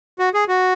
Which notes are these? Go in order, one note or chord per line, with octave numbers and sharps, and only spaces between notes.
F#4
G#4
F#4